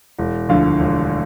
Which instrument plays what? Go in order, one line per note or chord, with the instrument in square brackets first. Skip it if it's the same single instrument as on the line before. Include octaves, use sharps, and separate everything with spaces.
[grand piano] E1
D2 D3 F3 F5
E1